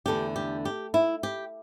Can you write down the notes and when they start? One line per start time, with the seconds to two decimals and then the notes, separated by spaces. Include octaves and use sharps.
0.06 E2 D3 A3 D4 G4
0.36 G4
0.65 G4
0.94 E4
1.23 G4